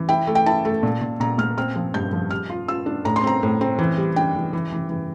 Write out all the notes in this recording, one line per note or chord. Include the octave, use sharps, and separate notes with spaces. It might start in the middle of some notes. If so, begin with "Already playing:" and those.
Already playing: E3
E4 G5
A3
G5
E4 A5
A3
A#2
A#2
A#2 A#5
A#2 F6
C4 F6
F3
G2 G6
F3
G3 F6
F4
F4 E6
D4
A2 A#5
C6
C4 A#5
A2
C4
E3
G3
D4 G5
E3
E3
E3
E3